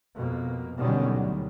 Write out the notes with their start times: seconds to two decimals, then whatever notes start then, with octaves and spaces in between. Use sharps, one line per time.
0.15 F2 B2 A#3
0.77 B2 D3 D#3 F#3 G3 C#4
1.13 D2